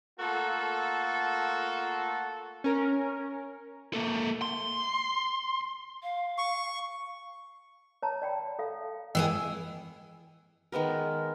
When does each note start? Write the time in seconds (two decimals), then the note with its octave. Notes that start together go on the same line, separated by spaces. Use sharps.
0.20 A3 A#3 F4 F#4 A4
2.64 C#4 A#4
3.94 A#3 A4
4.42 C6
6.03 F5
6.38 C#6
8.02 C#5 A5 A#5
8.22 D5 G5 B5
8.59 A4 F5
9.15 E3 A#3 G#4 D#5 G5 E6
10.72 D#3 G#3 B3 A#4